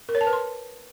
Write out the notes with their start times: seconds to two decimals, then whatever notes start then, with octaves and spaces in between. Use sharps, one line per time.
0.09 A#4
0.15 C#5
0.21 A5
0.27 B4
0.33 C6